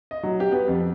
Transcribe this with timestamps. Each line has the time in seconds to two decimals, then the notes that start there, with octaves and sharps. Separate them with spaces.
0.11 D#5
0.23 F#3
0.40 G4
0.52 B3
0.68 F2